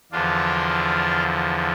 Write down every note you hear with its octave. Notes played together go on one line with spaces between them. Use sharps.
E2 D3 F3 D4 F4